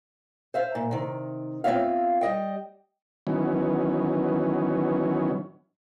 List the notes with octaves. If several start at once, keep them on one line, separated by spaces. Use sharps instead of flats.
C5 E5 F5
A#2
C3 D#3
B3 C4 F4 C#5 E5 F5
G3 D#5 G5
D#3 E3 F#3 B3 C#4